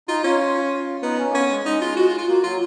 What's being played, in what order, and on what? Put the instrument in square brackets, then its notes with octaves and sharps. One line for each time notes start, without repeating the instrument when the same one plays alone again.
[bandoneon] D#4 [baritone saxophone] F4
[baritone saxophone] C#4 [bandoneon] F4
[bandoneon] F4
[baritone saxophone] B3 [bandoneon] D#4
[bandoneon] C#4
A#3
[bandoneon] B3 [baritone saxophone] C#4
[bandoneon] G#3
[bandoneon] G#3 [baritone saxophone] D#4
[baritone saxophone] F4
F#4
F4
F4
[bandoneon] A#3 [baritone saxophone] F#4
[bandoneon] F#3 [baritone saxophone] F4